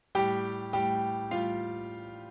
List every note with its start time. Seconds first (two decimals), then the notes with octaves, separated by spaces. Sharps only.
0.15 A2 G3 G4 G5
0.73 A2 G3 G4 G5
1.31 A2 G3 F4 F5